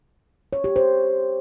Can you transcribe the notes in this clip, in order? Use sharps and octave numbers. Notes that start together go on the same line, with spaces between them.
C#5
G4
C5